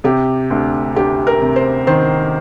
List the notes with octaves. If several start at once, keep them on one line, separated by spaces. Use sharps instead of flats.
C3 G4
D2
D2 G4
A#4
C3
C5
D#3 C5